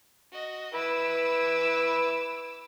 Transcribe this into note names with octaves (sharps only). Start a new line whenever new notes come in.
F#4 D#5
E4 B4 D6 E6